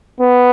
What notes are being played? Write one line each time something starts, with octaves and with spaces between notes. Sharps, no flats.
B3